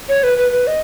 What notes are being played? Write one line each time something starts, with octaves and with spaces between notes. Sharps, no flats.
C#5
B4
B4
B4
D#5